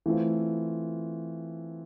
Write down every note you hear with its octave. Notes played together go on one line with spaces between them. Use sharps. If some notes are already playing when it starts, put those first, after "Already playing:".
E3 A3 C4 F4